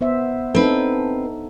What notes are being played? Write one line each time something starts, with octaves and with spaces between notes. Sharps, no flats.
B3 C5 E5
C4 D4 D#4 A4 B4